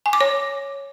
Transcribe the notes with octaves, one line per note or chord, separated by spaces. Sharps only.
G#5
D6
C#5